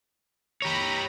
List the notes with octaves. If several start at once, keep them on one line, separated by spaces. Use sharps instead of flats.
G4 C#5 A#5 B5